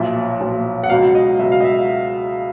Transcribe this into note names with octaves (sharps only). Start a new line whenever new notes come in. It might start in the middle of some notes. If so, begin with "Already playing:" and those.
Already playing: B1 A#2 F3 E5
B1 A#2 F3
F#5
C#2 B2 F#3 F5
D#5
C#2 B2 F#3 E5
F5
D#5
E5